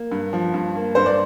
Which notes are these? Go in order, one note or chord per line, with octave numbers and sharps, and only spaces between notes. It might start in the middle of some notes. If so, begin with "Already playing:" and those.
Already playing: A#3
G2
F3
G2
A#3
G2 C5
D5